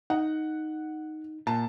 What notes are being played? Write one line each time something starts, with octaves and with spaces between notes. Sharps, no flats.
D#4 F#5
A#2 A5